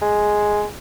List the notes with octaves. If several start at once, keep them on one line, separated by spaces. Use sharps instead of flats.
G#3